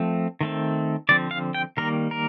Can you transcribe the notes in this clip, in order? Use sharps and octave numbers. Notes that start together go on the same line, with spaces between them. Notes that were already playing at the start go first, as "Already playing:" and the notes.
Already playing: F3 A3 C4
D#3 A3 C4
D3 F3 C4 D5
F5
G5
D#3 G3 A#3 A#4
A#4